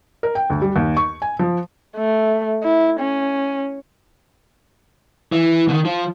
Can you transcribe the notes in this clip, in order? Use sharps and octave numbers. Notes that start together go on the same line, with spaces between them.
A#4
G5
D2
G3
D#2
C#6
G#5
F3
A3
E4
C#4
E3
B2 D#3
F3